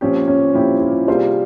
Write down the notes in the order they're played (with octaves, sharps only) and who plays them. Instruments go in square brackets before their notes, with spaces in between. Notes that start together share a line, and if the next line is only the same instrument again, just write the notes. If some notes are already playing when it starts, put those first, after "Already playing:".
[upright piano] A#2 F3 C4 G4 [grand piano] C#4
[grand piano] C#4
[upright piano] A#2 F3 C4 G4 [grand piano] E4
[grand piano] F4
[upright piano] C3 G3 A#3 F4 C5 [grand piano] G#4